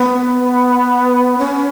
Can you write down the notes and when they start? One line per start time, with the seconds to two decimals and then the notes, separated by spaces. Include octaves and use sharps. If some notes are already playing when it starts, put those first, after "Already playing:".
Already playing: B3
1.38 C#4